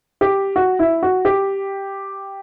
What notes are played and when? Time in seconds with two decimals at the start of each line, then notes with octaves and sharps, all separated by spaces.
0.21 G4
0.56 F#4
0.79 E4
1.03 F#4
1.25 G4